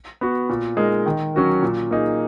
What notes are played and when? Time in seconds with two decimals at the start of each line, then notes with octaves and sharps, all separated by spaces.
0.21 B3 F#4
0.49 A#2
0.77 G#3 D#4 A#4
1.06 D#3
1.34 F#3 C#4 F#4 A#4
1.63 A#2
1.91 A#3 D#4 G#4